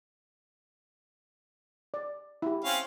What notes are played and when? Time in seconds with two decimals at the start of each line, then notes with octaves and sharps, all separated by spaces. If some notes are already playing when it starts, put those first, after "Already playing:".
1.94 D5
2.42 E4 G4
2.65 C4 C#4 F5